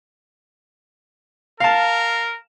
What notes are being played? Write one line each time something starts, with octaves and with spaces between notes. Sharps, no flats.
A#4 F5 A5